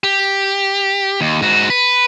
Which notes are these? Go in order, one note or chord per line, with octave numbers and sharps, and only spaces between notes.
G4
D#2
G#2 F#4
B4